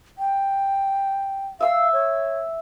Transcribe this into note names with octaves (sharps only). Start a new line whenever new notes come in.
G5
E5 F5 E6
C#5